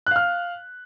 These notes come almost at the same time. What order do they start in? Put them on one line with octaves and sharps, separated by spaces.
F#6 F5 F6